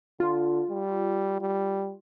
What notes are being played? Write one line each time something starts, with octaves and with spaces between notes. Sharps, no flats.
D3 F4
G3
G3